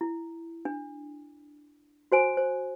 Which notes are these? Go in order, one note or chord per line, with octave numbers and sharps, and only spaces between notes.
E4
D4
F#4 C5 G#5
C5